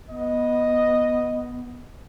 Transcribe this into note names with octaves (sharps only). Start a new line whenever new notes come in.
B3 D#5